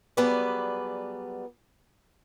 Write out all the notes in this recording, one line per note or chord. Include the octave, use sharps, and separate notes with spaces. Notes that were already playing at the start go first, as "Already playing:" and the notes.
F#3 G3 B3 G#4 B4 D5